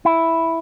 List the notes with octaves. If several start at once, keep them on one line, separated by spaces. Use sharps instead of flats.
E4